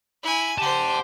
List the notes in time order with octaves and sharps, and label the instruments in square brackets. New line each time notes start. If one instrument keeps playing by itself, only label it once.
[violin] E4 G#5
[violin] G4 C5 [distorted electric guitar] F#5 A5